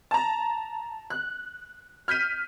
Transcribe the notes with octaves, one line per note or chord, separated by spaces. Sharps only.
A5 A#5
F#6
F6 G6 B6 D#7